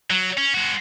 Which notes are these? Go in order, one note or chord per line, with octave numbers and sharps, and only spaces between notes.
F#3
C#4
G#3 F#4